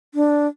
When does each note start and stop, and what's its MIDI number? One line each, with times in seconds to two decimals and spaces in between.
0.15 0.47 62